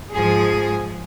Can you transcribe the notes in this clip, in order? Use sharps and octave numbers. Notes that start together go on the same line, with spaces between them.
G#2 F3 G#4